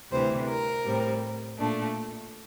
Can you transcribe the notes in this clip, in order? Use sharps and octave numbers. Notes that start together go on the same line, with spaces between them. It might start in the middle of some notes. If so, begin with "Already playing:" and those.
D2 C3 E3 G3 C5
A#4
A2 G3 C4
A#2 A3 D4